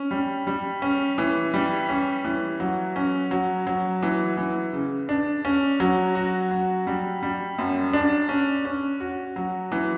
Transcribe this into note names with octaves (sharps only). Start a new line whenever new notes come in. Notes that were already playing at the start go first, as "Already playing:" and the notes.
Already playing: C#4
G3
G3
C#4
E3
G3
C#4
E3
F#3
C#4
F#3
F#3
E3
E3
C#3
D4
C#4
F#3
F#4
F#3
G3
G3
F#2
D4
C#4
C#4
F#4
F#3
E3